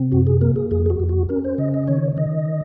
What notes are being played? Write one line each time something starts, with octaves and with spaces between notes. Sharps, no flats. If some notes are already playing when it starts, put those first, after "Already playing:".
Already playing: C3 C4
F#2 F#4
G#4
A#3 A#4
G#4
F2 G#4
G#4
F#4
F2
F#4
C#4 A#4
C5
C#3 D#5
D#5
D#3 C#5
D#3 D#5